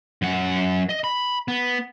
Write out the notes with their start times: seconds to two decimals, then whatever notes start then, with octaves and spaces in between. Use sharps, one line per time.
0.22 F#2 F#5
0.89 D#5
1.04 B5
1.48 B3